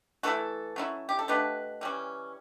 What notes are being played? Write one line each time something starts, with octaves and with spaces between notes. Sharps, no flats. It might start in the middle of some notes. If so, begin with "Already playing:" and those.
E3 A3 E4 F#4 A4
F#3 C#4 E4
G4
A4
B2 A3 D4 G4 B4
E3 G3 C#4